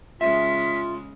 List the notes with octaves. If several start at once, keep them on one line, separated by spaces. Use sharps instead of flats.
C#3 G#3 C#4 F4 E5 B6